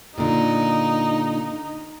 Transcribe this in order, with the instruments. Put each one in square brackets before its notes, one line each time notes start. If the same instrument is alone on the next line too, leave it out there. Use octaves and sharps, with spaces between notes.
[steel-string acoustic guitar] A#2 D3 [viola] D#4